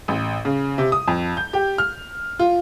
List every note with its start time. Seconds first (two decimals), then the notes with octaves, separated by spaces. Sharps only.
0.08 A1
0.45 C#3
0.78 C3
0.92 D#6
1.08 F2
1.37 G6
1.53 G4
1.78 F6
2.39 F4